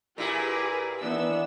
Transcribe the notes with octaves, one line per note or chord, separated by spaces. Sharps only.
A#2 E4 G4 G#4 A#4 B4
D#3 E3 B3 D4 E6